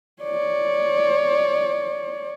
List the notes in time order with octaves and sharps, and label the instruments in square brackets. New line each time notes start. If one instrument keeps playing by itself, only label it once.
[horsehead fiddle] C#5 D5